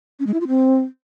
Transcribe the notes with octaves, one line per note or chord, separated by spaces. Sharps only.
C#4
G#3
E4
F4
C4